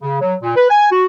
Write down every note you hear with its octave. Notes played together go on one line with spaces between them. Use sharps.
C#3
F#3
A#2
B4
G#5
F#4